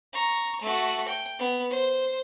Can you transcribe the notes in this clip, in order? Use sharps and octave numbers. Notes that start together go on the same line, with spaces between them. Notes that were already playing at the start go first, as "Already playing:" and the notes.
A#5 C#6
A3 F#4
G5
B3
C5